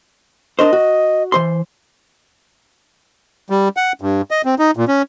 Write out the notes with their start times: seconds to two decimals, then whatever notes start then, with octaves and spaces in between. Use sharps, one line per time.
0.59 D4 A#4 C5 D#5
0.73 F#4
1.32 E3 C5 C6
3.50 G3
3.77 F#5
4.02 G2
4.31 D#5
4.45 C4
4.59 D#4
4.77 A#2
4.88 C#4